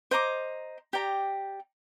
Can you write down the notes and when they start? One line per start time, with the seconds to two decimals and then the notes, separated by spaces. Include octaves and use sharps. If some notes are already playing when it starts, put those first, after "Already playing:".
0.11 C5 D#5 A#5 D6
0.93 G4 D5 G5 A#5